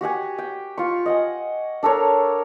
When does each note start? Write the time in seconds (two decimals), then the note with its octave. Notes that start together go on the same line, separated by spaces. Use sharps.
0.01 F#4 G4 F#5 G#5
0.38 G5
0.78 F4 C#6
1.06 D#5 F#5 G#5
1.83 D4 A4 A#4 C#5